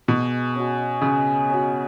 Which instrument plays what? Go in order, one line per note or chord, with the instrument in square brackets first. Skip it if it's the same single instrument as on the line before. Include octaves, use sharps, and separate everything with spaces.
[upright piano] B2 [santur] G#3
[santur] C#4 F#4
[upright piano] C#3 [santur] G#3
[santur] C#4 F#4